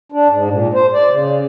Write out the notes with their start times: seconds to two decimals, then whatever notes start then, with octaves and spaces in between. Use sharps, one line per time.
0.12 D4
0.29 G#2
0.50 A#2
0.74 C5
0.94 D5
1.10 C#3